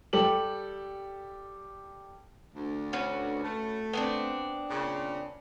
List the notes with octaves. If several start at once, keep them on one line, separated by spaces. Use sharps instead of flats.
G3 G4 A4 F#7
D2
C#4 F#4 B4
A3
B3 C4 D4
A#2 C#3